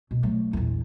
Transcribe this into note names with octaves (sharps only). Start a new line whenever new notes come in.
B2
F#3 A3
A#1 E2